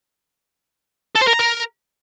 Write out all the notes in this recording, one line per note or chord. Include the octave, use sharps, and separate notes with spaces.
A4
C5
A#4
A#5
A#4